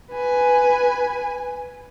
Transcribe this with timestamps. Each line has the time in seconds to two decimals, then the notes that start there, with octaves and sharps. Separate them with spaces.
0.12 B4 G#5